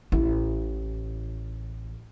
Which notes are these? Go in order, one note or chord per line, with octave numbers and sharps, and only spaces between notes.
A1 E4